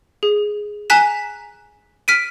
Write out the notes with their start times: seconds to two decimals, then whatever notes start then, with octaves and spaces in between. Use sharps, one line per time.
0.23 G#4
0.90 G#5 A#5 F#6 B6 E7
2.08 F6 B6 D7 D#7